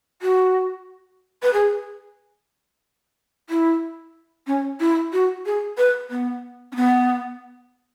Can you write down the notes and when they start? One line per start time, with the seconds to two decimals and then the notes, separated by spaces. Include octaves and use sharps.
0.22 F#4
1.43 B4
1.53 G#4
3.50 E4
4.47 C#4
4.80 E4
5.13 F#4
5.46 G#4
5.78 B4
6.10 B3
6.72 C#4
6.76 B3